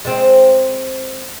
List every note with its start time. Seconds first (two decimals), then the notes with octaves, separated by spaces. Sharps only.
0.05 G#3 C4